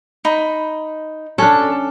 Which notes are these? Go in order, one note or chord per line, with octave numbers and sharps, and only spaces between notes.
D#4 B5
C#4 D4 A4